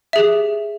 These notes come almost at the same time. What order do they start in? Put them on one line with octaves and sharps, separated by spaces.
E5 G#4 G4